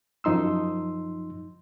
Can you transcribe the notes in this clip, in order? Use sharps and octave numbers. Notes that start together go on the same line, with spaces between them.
F#2 F3 D#4 C6 E6